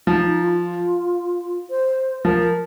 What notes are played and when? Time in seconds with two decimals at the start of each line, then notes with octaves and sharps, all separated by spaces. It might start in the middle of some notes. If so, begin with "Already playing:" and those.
0.07 F3 D#4
0.26 D#4
0.44 F4
1.71 C5
2.25 F3 A#4